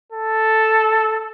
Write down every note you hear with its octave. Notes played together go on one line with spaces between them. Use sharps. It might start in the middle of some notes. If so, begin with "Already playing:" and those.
A4